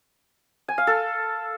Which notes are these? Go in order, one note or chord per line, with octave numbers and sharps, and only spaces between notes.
G#5
F5
A4